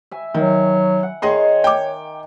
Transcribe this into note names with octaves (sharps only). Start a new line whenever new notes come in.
E5 G#5
D#3 F#3
F#5
D#3 G#4 C#5 D#5 C6
G5 D6